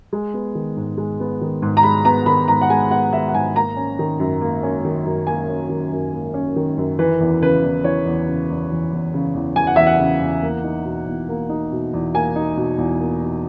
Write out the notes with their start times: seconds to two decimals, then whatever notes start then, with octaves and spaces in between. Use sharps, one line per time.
0.13 G#3
0.34 B3
0.55 D#3
0.77 G#2
0.97 G#3
1.20 B3
1.41 D#3
1.62 G#2
1.77 A#5
1.83 G#3 B5
2.05 B3 A#5
2.26 D#3 B5
2.48 G#2 A#5
2.61 F#5
2.70 G#3 G#5
2.91 B3 F#5
3.13 D#3 E5
3.28 F#5
3.34 G#2 G#5
3.55 A#3 A#5
3.76 C#4
3.99 D#3
4.20 F#2
4.41 A#3
4.63 C#4
4.85 D#3
5.05 F#2
5.27 A#3 G#5
5.49 C#4
5.70 D#3
5.92 F#2
6.13 A#3
6.34 C#4
6.56 D#3
6.77 F#2
6.99 E3 B4
7.20 E2
7.41 C#3 B4
7.63 E2
7.84 E3 C#5
8.06 E2
8.28 C#3
8.50 E2
8.71 E3
8.93 E2
9.14 C#3
9.34 E2
9.56 E3 G#5
9.67 F#5
9.76 E2 E5
9.87 F#5
9.99 C#3
10.21 E2
10.43 A#3
10.64 D#4
10.85 B2
11.07 E2
11.29 A#3
11.49 D#4
11.72 B2
11.93 E2
12.14 A#3 G#5
12.36 D#4
12.57 B2
12.78 E2
13.00 A#3
13.22 D#4